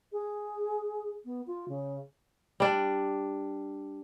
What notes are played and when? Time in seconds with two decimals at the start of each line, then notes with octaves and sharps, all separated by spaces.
0.13 G#4
1.25 B3
1.47 F4
1.68 C#3
2.60 G3 D4